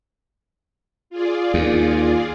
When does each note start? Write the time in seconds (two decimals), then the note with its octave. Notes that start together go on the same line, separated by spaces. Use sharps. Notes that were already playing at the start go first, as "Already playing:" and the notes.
1.10 F4 G#4 D5
1.54 D#2